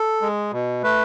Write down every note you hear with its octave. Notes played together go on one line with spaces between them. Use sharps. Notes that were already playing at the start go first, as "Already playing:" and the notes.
Already playing: A4
G#3
B2
A3 B4